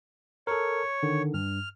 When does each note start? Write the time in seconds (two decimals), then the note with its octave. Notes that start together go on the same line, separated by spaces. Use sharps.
0.47 A4 A#4 C#5
1.03 D3 D#3
1.34 G2 F6